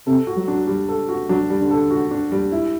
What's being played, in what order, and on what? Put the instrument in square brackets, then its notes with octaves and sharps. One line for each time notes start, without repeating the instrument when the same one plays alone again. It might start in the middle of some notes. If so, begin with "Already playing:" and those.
[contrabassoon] C3 [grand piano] A4
[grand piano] F#4
[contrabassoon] F#3
[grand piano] D4
G3
A4
F#4
[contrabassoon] F#3 [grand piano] D4
[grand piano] G3
[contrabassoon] D3
[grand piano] A4
F#4
D4
G3
E4